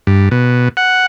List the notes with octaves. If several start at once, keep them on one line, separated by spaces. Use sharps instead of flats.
G2
B2
F#5